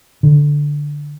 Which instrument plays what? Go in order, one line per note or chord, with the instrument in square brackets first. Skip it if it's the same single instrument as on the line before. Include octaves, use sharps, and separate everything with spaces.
[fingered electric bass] D3